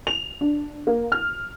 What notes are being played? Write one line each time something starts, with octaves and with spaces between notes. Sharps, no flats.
F7
D4
A#3
F6